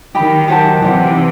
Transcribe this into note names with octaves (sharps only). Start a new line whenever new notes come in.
D#3 F#3 G4 D#5 G5 B5
G4 C5 F#5 A5
C3 E3 G4 C5 F#5
D#4